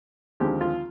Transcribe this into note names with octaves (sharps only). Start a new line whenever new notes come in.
D#2 D3 F3 G#3 C4 G4
F4